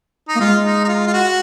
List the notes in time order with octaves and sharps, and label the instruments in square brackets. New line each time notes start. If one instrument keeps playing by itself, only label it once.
[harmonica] D#4
[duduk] A#3
[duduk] G#3 [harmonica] F4
[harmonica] D#4
D#4
F4
F4
F#4